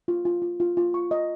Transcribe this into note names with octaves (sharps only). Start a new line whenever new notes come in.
F4
F4
F4
F4
F4
C#6
D#5